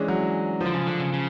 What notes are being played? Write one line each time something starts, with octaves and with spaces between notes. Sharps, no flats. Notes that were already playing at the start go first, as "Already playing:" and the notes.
Already playing: E3 G#3 C#4 D4
F#3
F3
D3
C#3
D3
C#3
C#3